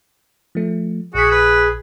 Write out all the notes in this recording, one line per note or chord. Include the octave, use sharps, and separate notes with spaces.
F3 A3
A#1 F#4 G#4 B6
B4